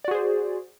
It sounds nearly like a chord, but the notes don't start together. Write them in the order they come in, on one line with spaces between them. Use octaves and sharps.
D5 F#4 G#4 C5